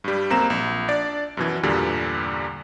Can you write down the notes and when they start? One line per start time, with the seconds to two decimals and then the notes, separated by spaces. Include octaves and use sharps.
0.04 G2 G3
0.30 B1 A#3 C4 A#5 E7
0.50 A#1
0.88 D4 D5
1.37 F#2 B2 E3
1.63 E2 G2 A#2 D3 G3